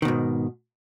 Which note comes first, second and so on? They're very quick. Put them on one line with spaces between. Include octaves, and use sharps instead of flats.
D#3 B2 G#2